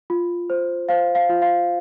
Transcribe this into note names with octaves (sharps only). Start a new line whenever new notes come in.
F4
C5
C5 F5
F5
F4
F5